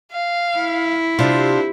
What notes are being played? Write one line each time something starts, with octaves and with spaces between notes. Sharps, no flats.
F5
E4
C3 D4 F4 C5